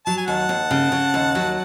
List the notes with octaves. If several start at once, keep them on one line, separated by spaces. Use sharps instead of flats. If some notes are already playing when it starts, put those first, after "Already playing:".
F#3 A5
G#5
D#2 F#5 A5
D#2
C#3
C#3
D#2
F#3